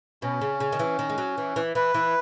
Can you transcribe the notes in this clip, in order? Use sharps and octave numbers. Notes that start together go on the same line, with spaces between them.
B2 C#4
C#3
C#3
D#3
E3
D#3
G#3
F#3
E3
E3
E3 B4
E3